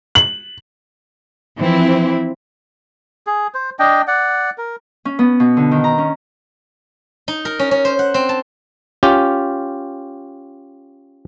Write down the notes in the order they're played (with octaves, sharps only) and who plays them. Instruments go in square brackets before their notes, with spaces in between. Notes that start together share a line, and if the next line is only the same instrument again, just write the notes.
[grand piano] F#7
[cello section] E3 F3 C4 E4
[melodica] G#4
C5
D4 D#5 G5
D5 F#5
A#4
[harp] C#4
B3
B2
D3
D#3
A#5
C#4
[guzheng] D#4
A#4
C#4
C#4
C5
F#5
C4
A5
[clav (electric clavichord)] C#4 F4 G4